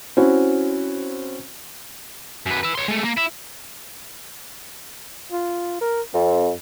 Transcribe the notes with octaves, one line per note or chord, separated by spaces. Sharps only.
C4 C#4 E4 F#4
F#2 B4
B4 E5
C#5 C6
G#3 A3
A#3
E4
F4
A#4
F2 C4